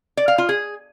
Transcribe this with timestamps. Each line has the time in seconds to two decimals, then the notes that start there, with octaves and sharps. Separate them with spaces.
0.17 D5
0.28 F5
0.38 F4
0.49 G#4